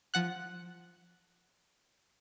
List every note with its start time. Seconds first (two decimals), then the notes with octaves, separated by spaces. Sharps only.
0.14 F3 F#5 F#6